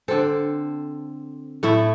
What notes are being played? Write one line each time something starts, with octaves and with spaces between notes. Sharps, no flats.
D3 C4 A4 C5
A2 A3 E4